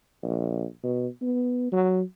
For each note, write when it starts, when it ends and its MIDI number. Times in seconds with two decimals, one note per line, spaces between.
0.23 0.64 34
0.83 1.07 47
1.22 1.71 59
1.72 2.01 54